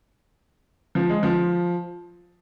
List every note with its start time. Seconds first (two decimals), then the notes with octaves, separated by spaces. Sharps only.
0.95 F3
1.09 G#3
1.23 F3